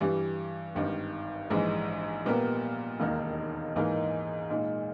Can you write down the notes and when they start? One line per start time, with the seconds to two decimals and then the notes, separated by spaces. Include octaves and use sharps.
0.01 G2 E3 G3
0.75 G#1 G2 D#3
1.50 A#1 G#2 E3 G#3
2.26 A#2 G3 B3 G4 A#4
3.00 E1 D#2 D#3 A#3 D#4
3.76 G#2 E3 A#3 D#4 A#4
4.50 A#2 G#3 D#4